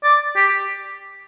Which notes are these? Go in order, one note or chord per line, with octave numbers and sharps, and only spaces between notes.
D5
G4